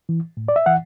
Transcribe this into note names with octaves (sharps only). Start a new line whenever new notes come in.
E3
A2
D5
E5
E3 F#5